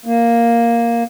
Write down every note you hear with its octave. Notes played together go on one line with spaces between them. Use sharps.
A#3